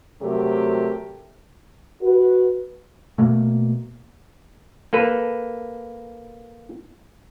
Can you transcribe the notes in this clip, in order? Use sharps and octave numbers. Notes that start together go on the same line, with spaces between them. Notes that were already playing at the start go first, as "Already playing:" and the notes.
C3 F#3 A3 G4 A#4
F#4 B4
B2 A3 A#3
A#3 A4 B4